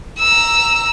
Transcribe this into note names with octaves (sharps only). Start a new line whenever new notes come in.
A#5 E6